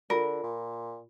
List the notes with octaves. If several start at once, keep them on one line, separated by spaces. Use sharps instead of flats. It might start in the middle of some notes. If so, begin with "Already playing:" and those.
D3 F4 A#4
A#2